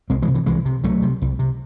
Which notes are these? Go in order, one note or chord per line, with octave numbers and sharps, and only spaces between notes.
C2 G#3 C4
E3 G#3
C3
E3
C2 E3 G#3
C3
C2 F#3 A3
C3
C2
C3